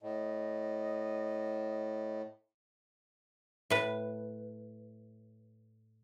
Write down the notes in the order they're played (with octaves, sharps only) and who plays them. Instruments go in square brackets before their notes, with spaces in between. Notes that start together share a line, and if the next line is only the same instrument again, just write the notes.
[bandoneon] A2 [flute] D#5
[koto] A2 B4